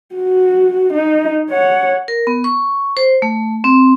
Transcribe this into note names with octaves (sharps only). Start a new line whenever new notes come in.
F#4
D#4
C#5 F#5
A#4
B3
C#6
C5
A3
C4